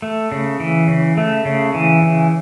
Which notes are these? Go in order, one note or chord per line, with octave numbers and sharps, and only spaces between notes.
A3
C#3
E3
C#3
A3
C#3
E3
C#3